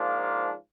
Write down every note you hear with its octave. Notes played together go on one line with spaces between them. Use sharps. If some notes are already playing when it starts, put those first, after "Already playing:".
Already playing: G#2 F3 A#3 D4 F4